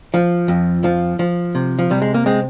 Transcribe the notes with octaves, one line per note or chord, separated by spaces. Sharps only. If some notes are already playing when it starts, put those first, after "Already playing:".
F3
F2
F3
F3
C3
F3
C3 G3
G#3
A#3
G#3 C4